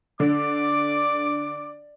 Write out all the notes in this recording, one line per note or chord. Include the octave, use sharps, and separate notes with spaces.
D3 D5 D6